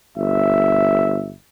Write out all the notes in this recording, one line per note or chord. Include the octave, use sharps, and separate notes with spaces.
G1 E5